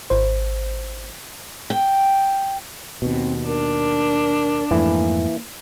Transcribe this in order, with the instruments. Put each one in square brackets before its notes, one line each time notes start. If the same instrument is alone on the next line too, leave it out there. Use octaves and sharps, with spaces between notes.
[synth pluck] G#1 C5
[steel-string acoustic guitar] G5
[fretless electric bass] D#2 B2 [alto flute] C4
[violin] D4 [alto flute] A#4
[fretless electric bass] F2 G#2 A3 [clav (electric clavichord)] E3 [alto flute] A#3